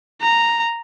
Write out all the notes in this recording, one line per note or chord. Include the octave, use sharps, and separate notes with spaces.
A#5